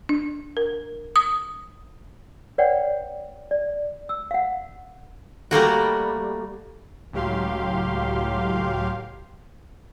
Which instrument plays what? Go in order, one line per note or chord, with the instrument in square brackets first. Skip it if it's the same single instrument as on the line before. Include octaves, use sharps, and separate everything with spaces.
[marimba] D4
A#4
D#6
[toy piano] B4 C#5 D5 F#5 G5
D5
E6
F5 F#5
[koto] G3 A3 A#3 F#4
[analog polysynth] C#2 A2 F#3 G4 F5 C6